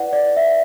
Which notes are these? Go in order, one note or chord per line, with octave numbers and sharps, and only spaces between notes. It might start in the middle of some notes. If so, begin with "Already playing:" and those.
Already playing: E4 B4 D5 F#5
D5
E5